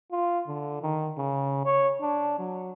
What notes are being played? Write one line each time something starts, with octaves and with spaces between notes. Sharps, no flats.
F4
D3
D#3
C#3
C#5
D4
F#3